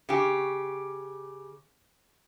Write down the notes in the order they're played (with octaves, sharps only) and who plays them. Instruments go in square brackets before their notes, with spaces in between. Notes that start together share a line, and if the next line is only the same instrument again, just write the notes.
[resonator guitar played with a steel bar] C#3 G4